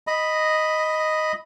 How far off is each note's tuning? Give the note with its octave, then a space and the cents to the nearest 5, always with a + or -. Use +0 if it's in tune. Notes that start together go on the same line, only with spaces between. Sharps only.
D#5 +0 B5 +0